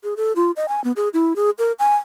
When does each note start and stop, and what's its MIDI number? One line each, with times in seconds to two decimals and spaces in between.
0.04 0.14 68
0.17 0.33 69
0.36 0.51 65
0.56 0.66 75
0.68 0.83 80
0.84 0.92 59
0.96 1.09 68
1.14 1.36 64
1.36 1.50 68
1.59 1.72 70
1.79 1.96 80